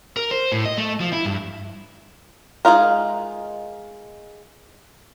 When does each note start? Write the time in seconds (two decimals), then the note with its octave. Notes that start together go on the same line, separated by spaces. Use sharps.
0.17 A#4
0.31 C5
0.52 A2
0.65 D#5
0.78 A3
1.01 F3
1.13 E4
1.26 G2
2.65 G#3 D#4 F4 A#4